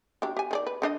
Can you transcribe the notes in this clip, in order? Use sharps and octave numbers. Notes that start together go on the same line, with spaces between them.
F#3 D4 G4
G4 G#5
D#3 G#4 D5
B4
D3 D4 D#5